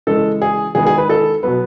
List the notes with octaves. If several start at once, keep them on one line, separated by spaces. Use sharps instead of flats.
C#3 E3 G#3 A4
G#4
D#3 G#3 B3 G#4
G#4
B4
A4
B2 F#3 B3 B4